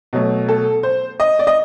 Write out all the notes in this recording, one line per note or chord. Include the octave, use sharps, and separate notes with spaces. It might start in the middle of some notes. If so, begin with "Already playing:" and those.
B2 F#3 A3
A4
C5
D#5
D5
D#5